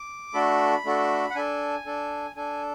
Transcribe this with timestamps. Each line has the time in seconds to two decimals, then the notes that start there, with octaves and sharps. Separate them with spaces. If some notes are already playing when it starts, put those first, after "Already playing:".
Already playing: D6
0.34 A3 D4 F#4 A4 B5
0.85 A3 D4 F#4 A4
1.30 F#5
1.35 D4 A4 G#5
1.86 D4 A4
2.36 D4 A4 G#5